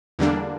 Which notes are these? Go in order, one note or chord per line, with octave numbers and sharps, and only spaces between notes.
E2 D3 G3 A#3 D4